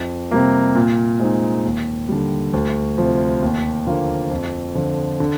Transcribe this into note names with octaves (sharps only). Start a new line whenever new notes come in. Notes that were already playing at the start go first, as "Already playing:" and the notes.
Already playing: F2
C3 G3 A#3
A#2
G#3 C4 D#4
D#2
D3 G3
D2
C3 F3
D#2
D3 F3 A#3 F4
F2
D3 F3
D3